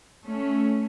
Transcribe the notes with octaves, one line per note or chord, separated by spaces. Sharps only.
A3 C#4